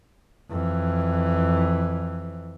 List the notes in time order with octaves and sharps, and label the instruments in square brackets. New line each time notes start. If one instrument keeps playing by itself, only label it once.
[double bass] F2 E3